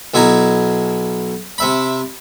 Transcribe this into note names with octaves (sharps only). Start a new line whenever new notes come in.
B1 B2 E4 G#5 A#5
C3 E5 B5